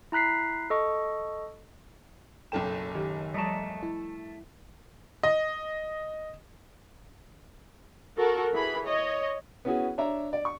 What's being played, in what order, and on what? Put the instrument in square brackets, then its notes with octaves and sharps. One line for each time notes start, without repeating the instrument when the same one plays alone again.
[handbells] E4 A#5 F#6 B6 C7
A4 D#5 C#6
[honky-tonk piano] F#1 B1 E7 [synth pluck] A4 G5
[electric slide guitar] D#3 [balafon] G4
[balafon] F3 G3 [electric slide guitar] A3 A5 [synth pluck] D#5 A#5
[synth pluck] E4
[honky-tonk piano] D#5
[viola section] F#4 A4 A#4
E3 G#4 B5
C#5 D#5
[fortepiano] B3 C#4 E4 F#4 G#4
D4 C#5 E5 A#5
D5
C#6